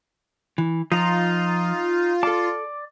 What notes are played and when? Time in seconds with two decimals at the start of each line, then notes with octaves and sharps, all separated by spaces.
0.58 E3
0.92 F3 D#4 F4 A#5
2.23 A4 D5 A5